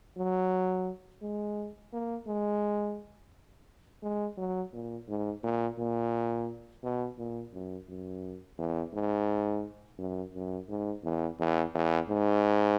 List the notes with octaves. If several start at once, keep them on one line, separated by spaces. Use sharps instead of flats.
F#3
G#3
A#3
G#3
G#3
F#3
A#2
G#2
A#2
A#2
B2
A#2
F#2
F#2
E2
G#2
F#2
F#2
G#2
E2
E2
E2
G#2